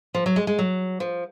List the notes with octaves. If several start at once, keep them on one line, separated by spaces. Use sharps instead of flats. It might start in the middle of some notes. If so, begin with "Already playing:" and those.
F3
F#3
G#3
G#3
F#3
F3